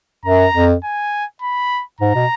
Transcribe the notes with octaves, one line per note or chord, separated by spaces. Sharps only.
F#2 A#5
F2
G#5
B5
G#2 A#5
B2